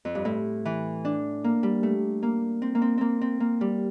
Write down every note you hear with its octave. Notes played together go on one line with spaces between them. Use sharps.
F2
G2
A2
E3
D4
A#3
G3
A3
A#3
C4
A#3
C4
A#3 C4
C4
A#3
G3